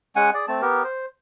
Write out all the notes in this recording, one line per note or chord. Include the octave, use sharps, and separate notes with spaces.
G#3 C#4 F#5 G#5
G#4 D5
A3 C4 A5
B3 G4 A#4
C5